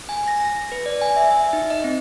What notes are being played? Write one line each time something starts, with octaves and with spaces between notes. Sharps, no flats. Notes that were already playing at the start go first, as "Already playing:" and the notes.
G#5
A#6
A#6
B4
D5
G#5
E5
E5
D#4
D#5
C4